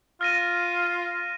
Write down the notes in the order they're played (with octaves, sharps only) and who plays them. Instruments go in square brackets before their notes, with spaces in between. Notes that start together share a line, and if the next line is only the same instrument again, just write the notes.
[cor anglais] F4 [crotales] F6 A#6 D#7